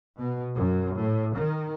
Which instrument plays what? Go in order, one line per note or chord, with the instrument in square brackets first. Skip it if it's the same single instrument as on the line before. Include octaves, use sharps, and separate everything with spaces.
[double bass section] B2
F#2
A2
D#3